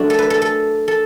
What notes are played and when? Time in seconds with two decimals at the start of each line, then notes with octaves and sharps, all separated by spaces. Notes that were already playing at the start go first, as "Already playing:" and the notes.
Already playing: F#3 A3 D4
0.10 A4
0.19 B4
0.30 A4
0.42 A4
0.88 A4